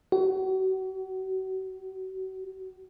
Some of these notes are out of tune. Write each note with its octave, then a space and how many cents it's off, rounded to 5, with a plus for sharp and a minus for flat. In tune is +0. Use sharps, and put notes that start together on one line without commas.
F#4 +35